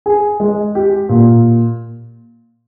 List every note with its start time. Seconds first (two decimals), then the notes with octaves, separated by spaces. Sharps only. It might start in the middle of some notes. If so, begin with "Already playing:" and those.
0.06 G#4
0.40 G#3
0.75 G4
1.09 A#2